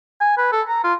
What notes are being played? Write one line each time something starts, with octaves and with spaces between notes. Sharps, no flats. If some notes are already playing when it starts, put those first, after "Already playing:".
G#5
B4
A4
A#5
F4